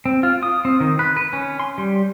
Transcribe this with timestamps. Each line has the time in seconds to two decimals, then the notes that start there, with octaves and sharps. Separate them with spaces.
0.06 C4
0.23 F4
0.43 D#6
0.65 C4
0.80 D#3
0.99 B4
1.17 B4
1.33 C#4
1.59 C6
1.78 G3